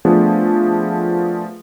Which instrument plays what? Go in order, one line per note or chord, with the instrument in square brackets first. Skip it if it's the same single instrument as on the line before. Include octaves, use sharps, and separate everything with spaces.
[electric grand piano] F3 A3 B3 D4 G#4